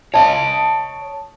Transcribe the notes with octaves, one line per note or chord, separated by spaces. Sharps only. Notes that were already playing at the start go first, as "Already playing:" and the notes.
C#5 D#5 A5